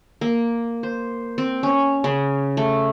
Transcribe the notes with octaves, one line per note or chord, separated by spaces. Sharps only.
A#3
C5
C4
C#4
C#3
A3